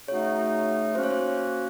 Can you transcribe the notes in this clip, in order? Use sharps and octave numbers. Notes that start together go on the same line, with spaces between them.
C#3 A3 D#4 F#4 C#5
F#3 A#3 C#4 F#4 C5
C#5
C5